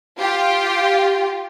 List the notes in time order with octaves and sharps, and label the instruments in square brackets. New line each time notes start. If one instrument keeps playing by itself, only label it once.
[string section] F4 G4